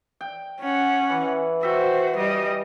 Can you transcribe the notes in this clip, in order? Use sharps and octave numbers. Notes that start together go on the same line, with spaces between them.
G5
C#4 F#5
E3
F#4 C5 E5 G5
G3 D#5